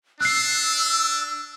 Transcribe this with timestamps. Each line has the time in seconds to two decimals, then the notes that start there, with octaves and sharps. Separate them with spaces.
0.21 D4 E6 F#6 C7